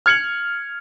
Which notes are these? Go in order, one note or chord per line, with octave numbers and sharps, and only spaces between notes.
F6 G#6 C#7 F7 F#7